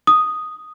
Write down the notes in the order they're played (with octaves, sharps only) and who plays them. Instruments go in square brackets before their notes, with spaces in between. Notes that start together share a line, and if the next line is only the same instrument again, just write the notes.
[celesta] D#6